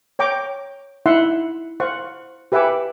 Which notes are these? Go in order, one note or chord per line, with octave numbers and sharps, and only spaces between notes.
C#5 G5 A#5 D6
D#4 E4 E5 F#5 C6
C5 F5 F#5 C#6
G4 B4 E5 F#5 G#5 D6